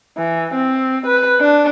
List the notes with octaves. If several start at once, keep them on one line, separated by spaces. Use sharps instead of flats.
E3
C4
B4
D4